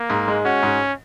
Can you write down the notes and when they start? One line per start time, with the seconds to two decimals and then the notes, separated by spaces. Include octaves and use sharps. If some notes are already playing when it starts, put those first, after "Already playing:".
Already playing: A#3
0.10 G#2
0.28 G#3
0.45 C#4 F#4
0.63 G#2